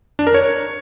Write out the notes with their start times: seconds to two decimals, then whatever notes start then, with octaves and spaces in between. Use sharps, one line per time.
0.19 D4
0.27 A#4
0.34 C#5